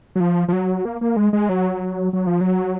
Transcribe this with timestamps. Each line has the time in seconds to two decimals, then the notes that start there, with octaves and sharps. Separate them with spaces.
0.15 F#3
0.20 F3
0.48 F3
0.53 F#3
0.85 A#3
1.01 A#3
1.16 G#3
1.33 G#3
1.49 F#3
2.13 F#3
2.27 F3
2.41 F#3